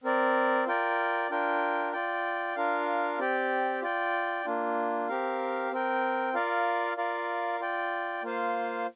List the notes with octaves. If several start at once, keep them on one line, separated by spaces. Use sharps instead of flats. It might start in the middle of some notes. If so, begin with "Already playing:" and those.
C4 A#4 D5
F4 A#4 D5 G5
D4 F4 A#4 G5
F4 D5 G5
D4 F4 A#4 F5
C4 G4 D5 G5
F4 D5 G5
A#3 D4 F4
C4 G4 A#4 F5
C4 A#4 G5
F4 A#4 D5 F5
F4 A#4 D5 F5
F4 D5 G5
A#3 F4 C5 F5